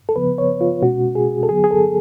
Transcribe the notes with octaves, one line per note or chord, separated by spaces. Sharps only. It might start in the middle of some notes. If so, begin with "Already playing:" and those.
A4
C#3 F3 B3 B4
C#5
F4
B2 G#3 C#4 F#4
G#4
A4
D3 F#3 B3 G#4
G#4
A4